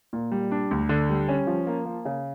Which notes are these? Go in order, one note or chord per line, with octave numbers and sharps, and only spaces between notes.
A#2
G3
D4
D2
D3
G3
C#4
F3
A#3
A#3
C#3